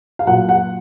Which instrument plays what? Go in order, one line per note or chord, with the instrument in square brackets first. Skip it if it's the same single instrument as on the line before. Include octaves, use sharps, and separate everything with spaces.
[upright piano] F5
A#2 F#3 F#5
F#5